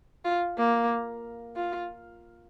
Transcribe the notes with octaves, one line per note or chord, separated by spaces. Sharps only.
F4
A#3
F4